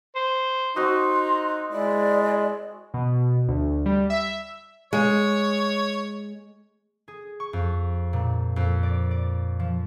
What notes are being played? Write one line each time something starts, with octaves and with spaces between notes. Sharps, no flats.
C5
C4 D#4 F#4 D#5 C6
G#3 E4 D5
B2
D2
G3
E5
G#3 C#5
G#4
C#6
F2
A#2
F2
D5
D5
F3